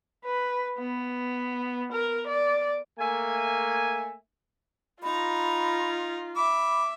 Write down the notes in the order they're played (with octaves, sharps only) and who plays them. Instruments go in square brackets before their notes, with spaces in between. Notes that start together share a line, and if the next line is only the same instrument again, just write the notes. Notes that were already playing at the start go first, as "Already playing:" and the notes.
[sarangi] B4
B3
A#4
D5
[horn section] A3 A#3 E5 G#5
[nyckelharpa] D#4 A#5 [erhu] F4 [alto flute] B5
[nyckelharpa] E5 [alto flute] B5 [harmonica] D6